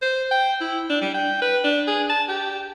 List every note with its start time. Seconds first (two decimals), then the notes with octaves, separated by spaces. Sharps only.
0.02 C5
0.31 G5
0.61 E4
0.90 D4
1.02 G3
1.15 G5
1.42 B4
1.64 D4
1.88 G#4
2.10 A5
2.29 G4